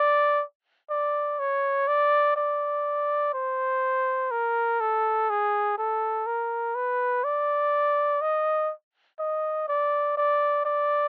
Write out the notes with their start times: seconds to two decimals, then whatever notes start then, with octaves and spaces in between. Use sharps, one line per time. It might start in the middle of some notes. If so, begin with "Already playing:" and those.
Already playing: D5
0.90 D5
1.39 C#5
1.88 D5
2.37 D5
3.34 C5
4.31 A#4
4.80 A4
5.30 G#4
5.78 A4
6.27 A#4
6.75 B4
7.24 D5
8.21 D#5
9.19 D#5
9.68 D5
10.17 D5
10.65 D5